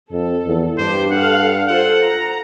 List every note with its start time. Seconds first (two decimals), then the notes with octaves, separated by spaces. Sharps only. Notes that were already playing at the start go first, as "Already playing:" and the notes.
0.12 F2 A4
0.46 E2
0.78 G2 D4 G4 C5
1.11 A4 F5 F#5
1.68 F4 A4 C5 F#5
2.04 A#5